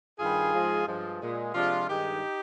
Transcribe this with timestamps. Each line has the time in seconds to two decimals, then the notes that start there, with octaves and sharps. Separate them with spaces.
0.19 G2 D#3 G3 F4 G#4
0.53 G#2 F3 G#3
0.87 G2 F3 G#3
1.21 A#2 G#3
1.55 C3 F3 G#3 D4 F4
1.88 G2 D#3 G#3 D#4 G4